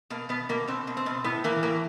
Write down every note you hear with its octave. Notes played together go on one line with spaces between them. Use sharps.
B2 A#3
B2 B3
B2 A#3
B2 C4
B2
C4
B2
A2 B3
E3 A#3
A2 A#3